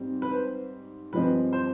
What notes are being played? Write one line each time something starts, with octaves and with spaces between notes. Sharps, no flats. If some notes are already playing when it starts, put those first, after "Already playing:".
Already playing: G#2 G3 C4
B4
C5
G2 F3 G#3 C4 B4
C5